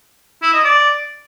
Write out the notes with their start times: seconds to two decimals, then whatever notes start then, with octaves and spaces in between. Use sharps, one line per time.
0.42 E4
0.53 D#5
0.64 D5